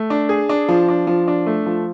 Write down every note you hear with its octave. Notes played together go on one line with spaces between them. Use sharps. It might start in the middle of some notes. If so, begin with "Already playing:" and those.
Already playing: A3
D4
G#4
D4
F3
D4
F3
D4
A3
F3